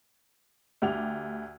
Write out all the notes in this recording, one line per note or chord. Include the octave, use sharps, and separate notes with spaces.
D2 G4 F7